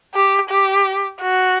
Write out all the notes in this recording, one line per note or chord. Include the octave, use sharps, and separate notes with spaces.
G4
G4
F#4